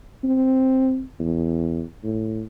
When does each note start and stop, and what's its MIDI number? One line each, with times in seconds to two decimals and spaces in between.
0.24 1.03 60
1.19 1.83 40
2.03 2.44 45